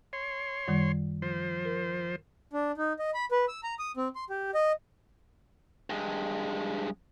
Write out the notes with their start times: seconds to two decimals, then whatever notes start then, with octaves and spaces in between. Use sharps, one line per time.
0.13 C#5 C6
0.67 F#2 D#3 G3
1.22 F3 C5
1.65 A#4
2.53 D4
2.77 D#4
2.99 D#5
3.14 B5
3.31 B4
3.48 E6
3.63 A#5
3.79 D#6
3.97 C4
4.15 C6
4.30 G4
4.55 D#5
5.90 G2 G#3